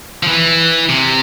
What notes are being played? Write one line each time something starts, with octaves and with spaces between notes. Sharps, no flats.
F3
E3
C3